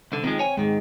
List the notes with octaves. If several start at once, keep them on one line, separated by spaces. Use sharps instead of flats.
C2 D3
D#3 F3 G#3 C4
C#5 G#5
G#2 D#3 G#3